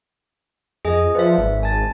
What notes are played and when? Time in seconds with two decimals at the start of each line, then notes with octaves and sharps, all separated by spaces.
0.85 F2 G#4 D#5 G#5
1.15 F3 B4 D5 E5
1.38 G#1
1.63 G#5 A5 A6